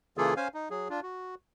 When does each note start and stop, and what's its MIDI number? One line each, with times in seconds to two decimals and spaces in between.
0.18 0.34 49
0.18 0.34 52
0.18 0.34 58
0.18 0.34 65
0.18 0.34 68
0.18 0.34 69
0.37 0.48 61
0.37 0.48 72
0.37 0.48 77
0.37 0.48 80
0.54 0.69 63
0.70 0.88 54
0.70 0.88 68
0.90 1.00 62
0.90 1.00 65
1.03 1.35 66